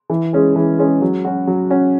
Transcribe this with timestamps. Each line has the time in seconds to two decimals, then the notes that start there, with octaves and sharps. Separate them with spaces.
0.10 E3
0.33 G#3 C#4 G#4
0.56 E3
0.79 G#3 C#4 G#4
1.02 F#3
1.25 C#4 F#4
1.47 F#3
1.70 C#4 F#4